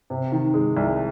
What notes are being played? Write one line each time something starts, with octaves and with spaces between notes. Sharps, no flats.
C3
D#3
G#3
C2